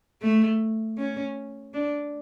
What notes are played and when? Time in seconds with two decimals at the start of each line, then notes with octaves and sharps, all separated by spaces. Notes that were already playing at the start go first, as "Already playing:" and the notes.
0.21 A3
0.97 C#4
1.74 D4